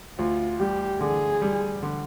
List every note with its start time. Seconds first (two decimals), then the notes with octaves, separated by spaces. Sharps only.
0.18 D2 F4
0.60 G3 G4
1.01 D3 G#4
1.42 G3
1.83 D3